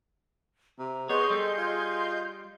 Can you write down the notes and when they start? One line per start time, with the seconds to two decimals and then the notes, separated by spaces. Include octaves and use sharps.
0.79 C3 A#5
1.09 B3 G#4 C#5 D#5 C6 G6
1.30 G3 A4
1.58 F4